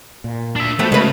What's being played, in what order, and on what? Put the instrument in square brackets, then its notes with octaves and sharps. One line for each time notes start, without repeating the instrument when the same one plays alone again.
[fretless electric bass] A#2
[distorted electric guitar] D4 E5
[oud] F3 B3 F#4 [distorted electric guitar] A3
[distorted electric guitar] C#3 [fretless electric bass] G#3 A3 [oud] F#4 B4